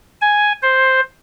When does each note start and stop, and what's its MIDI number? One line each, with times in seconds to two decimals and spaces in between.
0.21 0.53 80
0.62 1.00 72